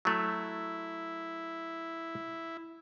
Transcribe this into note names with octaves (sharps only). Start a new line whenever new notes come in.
F#3 A3 E4